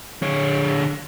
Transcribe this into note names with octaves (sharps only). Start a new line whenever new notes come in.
D3 C#5